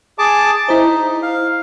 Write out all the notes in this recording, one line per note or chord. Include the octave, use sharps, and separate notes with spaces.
G#4 A5 D6
D#4 E4 C5
F5